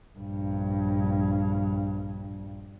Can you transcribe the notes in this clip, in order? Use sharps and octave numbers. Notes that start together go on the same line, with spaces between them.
A#1 G2